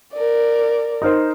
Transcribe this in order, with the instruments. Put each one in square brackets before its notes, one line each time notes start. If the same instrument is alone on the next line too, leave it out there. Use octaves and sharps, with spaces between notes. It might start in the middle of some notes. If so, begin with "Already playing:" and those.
[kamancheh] A#4 D5
[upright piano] D#4 A#4 C5